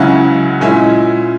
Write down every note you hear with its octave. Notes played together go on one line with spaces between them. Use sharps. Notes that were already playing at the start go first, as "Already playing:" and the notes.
Already playing: C#2 C#3 F#3 C#4 E4 F#5
A#2 G#3 C#4 E4